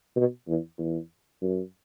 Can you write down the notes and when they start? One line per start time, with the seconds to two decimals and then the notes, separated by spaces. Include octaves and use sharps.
0.16 B2
0.48 E2
0.78 E2
1.42 F#2